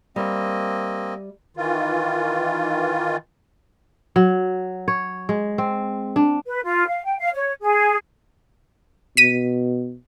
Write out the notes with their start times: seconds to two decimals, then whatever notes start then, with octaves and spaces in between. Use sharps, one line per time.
0.16 G3 A#3 C4 D#5 E5
1.57 D#3 E3 F4
4.16 F#3
4.88 C#5
5.29 G#3
5.58 C4
6.16 D4
6.46 B4
6.63 F4
6.88 F5
7.04 G5
7.20 F5
7.34 C#5
7.61 G#4
9.17 B2 B6 D#7